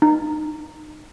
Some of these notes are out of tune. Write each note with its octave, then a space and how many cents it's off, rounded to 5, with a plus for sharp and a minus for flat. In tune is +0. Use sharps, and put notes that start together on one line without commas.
D#4 -30